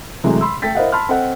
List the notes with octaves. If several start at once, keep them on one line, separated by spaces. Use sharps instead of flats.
C3 E3 F#3 G#3 A3
B5 C6 E6
A3 A4 G5 A6 B6
E4 A#4 C5 D#5 F5 F#5
A5 B5 C6 F6
C4 A4 D#5 F#5